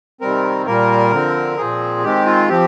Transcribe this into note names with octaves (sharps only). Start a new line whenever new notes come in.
C3 D#3 G3 C4 A#4
A#2 G3 A#3 A#4
D3 F3 C4
A#2 F3 C4 G#4
D#3 G#3 C4 G4
F4
F3 C4 G4